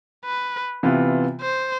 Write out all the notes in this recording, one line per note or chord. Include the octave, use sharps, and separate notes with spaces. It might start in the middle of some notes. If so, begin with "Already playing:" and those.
B4
C3 E3 B3 F4
C5